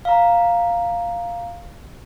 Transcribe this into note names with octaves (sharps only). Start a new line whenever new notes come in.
F5 A#5